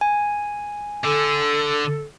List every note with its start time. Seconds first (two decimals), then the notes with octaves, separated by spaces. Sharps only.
0.01 G#5
1.05 D3 A4